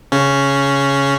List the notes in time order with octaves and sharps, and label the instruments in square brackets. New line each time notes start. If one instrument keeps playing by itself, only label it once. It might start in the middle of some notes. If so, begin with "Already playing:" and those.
[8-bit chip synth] C#3 C#4